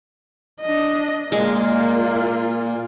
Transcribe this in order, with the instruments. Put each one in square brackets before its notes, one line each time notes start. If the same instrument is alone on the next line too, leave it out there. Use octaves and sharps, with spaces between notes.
[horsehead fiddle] D4 D#5
[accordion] A#2 [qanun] G#3 [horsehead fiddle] A#3 F4